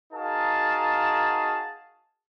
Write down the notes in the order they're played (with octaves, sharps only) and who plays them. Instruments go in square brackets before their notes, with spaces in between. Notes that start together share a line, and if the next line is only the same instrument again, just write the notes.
[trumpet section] D#4 F#4 G#4 A#4 F5 A5